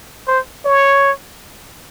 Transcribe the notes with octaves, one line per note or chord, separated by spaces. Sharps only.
C5
C#5